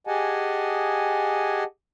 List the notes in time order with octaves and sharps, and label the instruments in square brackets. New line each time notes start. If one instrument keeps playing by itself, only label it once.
[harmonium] G4 G#4 D#5 F#5 G#5 A5